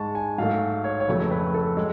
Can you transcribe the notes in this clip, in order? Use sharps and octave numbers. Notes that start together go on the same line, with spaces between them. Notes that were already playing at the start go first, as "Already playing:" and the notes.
Already playing: G#2 G#3 A5 C#6
G#5
G#2 F#3 A3 F5
C#5
C#5
F2 C#3 F#3 A3 B4
B4
A4
G#3